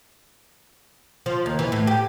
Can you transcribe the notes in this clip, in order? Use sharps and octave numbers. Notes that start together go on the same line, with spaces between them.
F3
D#2
E3
A2
G4